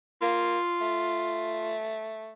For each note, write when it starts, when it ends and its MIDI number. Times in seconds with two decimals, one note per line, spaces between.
0.22 0.58 58
0.22 1.75 65
0.81 2.32 57